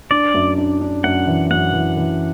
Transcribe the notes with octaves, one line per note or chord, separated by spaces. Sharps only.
D4 D5
F#2
D4
D4
F#2 F#5
E3
F#2 F#5
E3
E3